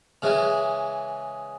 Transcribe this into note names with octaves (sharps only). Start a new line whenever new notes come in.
C#3 E3 G#3